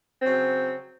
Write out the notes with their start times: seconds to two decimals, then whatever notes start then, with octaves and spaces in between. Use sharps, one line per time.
0.19 C4
0.23 F#3
0.26 C#3